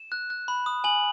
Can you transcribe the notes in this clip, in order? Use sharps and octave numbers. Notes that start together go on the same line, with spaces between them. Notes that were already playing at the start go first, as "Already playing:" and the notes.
Already playing: E7
F#6
F#6
B5
D#6
G#5 F#7